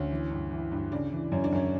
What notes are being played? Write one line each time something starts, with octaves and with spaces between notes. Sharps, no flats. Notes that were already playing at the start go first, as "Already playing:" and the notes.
Already playing: D2 C#4
E3
G2
E3
G2
C#3 D4
E3
F#2 C#4
D4
F#2 C#4